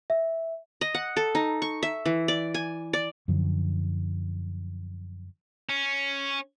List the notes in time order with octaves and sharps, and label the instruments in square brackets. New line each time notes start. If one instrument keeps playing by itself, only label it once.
[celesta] E5
[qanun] D#5
F#5
A4
D#4
C#6
E5
E3
D5
G#5
D5
[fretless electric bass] F#2 D3 F3 F#3
[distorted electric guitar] C#4